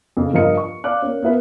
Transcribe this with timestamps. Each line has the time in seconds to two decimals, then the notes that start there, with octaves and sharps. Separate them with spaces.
0.17 F2 C#3
0.33 G2 F3 F4 A#4 D#5 C#7
0.57 C#6
0.84 D5 F5 D6 F#6
1.02 A#3 C#4
1.22 A#3 B3 E4 B4